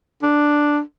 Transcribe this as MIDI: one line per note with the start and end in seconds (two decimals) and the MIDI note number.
0.22 0.80 62